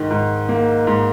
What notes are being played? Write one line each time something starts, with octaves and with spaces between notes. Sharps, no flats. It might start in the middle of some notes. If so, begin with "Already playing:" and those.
Already playing: G#2 D#3
G#2
A#3
G#2